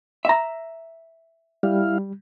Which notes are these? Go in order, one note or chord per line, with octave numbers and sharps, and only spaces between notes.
E5 A#5
G3 E4 F5